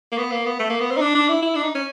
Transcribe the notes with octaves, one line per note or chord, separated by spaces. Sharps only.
A#3
B3
A#3
B3
A3
A#3
B3
C4
D#4
D4
D4
E4
E4
D4
D#4
C#4